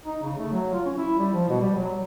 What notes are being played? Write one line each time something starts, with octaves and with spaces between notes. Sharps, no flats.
D#4
C#3
A3
F#3
F4
C#4
E4
G3
F3
B2
G3
F#3